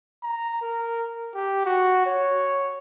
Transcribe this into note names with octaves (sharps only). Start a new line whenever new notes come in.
A#5
A#4
G4
F#4
C#5